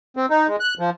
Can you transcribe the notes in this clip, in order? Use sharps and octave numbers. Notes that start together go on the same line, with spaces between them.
C4
D#4
G#3
F#6
F3